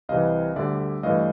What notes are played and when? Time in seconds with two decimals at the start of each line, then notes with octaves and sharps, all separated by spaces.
0.09 C2 C3 E3 D#5 F5
0.56 D2 D3 G3 D5 E5
1.03 G2 E3 A3 D#5 F5